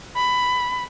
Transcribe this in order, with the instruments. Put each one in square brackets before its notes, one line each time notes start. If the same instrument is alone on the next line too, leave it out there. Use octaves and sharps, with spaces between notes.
[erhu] B5